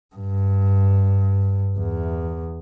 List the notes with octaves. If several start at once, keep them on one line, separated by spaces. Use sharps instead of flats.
G2
E2